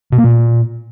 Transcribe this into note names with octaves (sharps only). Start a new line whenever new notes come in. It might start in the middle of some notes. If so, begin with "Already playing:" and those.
B2
A#3
A#2